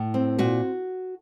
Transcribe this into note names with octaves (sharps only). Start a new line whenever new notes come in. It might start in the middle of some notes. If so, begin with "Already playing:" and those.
Already playing: A2
C4
A#2 F#4